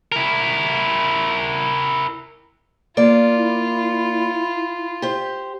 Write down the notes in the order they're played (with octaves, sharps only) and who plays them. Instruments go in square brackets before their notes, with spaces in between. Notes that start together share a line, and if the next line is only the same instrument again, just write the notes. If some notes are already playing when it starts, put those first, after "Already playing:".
[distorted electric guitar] E4 A#4
[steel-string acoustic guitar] A#3 D5 [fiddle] F4
[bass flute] E4
[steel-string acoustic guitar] G4 C5